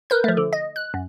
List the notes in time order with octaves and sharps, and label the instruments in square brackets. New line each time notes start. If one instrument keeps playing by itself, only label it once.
[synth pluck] A#4 B4 G6
F3 A3
D3
D#5
F#6
F#2